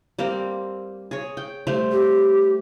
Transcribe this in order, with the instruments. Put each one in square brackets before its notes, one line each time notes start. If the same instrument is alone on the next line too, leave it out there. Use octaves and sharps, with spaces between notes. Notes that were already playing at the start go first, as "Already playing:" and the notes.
[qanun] G3 A#3 C4
G#4 C#5
G5
G3 A3 C5
[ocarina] G4